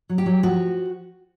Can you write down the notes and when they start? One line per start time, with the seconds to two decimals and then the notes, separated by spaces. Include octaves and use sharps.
0.09 F#3
0.18 G4
0.26 F#3
0.43 F3 F#4